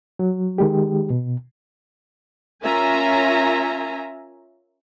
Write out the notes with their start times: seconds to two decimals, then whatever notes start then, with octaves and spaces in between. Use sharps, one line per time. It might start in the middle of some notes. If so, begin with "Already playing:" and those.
0.19 F#3
0.58 D#3 G#3 G4
1.10 B2
2.63 C#4 F4 A#4 E5 G#5 A#5